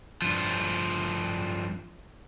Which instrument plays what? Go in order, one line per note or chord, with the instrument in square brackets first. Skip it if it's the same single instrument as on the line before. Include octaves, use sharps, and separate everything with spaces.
[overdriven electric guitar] G2 F3